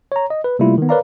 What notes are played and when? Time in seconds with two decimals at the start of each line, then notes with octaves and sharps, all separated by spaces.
0.12 C#5 A#5
0.30 D#5
0.44 B4
0.59 C3 G3 A3 A#3 E4 F4
0.78 D#3 B3
0.89 A#4 B4 C#5 D5 F5 A#5